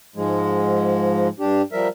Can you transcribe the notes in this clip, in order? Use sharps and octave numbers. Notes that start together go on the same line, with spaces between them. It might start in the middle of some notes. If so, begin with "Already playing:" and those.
G#2 F3 G#3
G2 D4 G4
F3 G3 A#4 E5